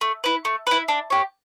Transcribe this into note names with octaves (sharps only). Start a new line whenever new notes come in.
A3
E4 B4
A3
E4 B4
D4
G4 C#5